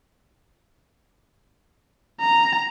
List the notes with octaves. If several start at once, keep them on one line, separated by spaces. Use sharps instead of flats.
A#5